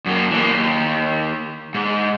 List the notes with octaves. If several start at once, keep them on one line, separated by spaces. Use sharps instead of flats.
F#2 A#3
E3 A#3
D#2
G#2